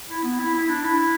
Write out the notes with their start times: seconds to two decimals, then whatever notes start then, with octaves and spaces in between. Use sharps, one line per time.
0.09 E4
0.23 B3
0.39 E4
0.55 E4
0.69 D4
0.84 E4